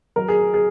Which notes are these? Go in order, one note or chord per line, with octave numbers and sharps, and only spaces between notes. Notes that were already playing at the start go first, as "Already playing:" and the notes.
F#3 A#4
G#4
G#4